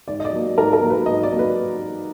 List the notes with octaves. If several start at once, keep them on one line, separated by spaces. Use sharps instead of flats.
G#2 D5
D#5
D5
F#3 A#3
G#2 A#4
A#4
F#3 A#3
B4
G#2 D#5
D5
F#3 A#3
B4